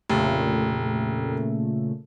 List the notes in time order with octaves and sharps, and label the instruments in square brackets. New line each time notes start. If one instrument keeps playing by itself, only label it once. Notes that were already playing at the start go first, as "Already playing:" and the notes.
[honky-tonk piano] F1 [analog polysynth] A#2 C#3 A3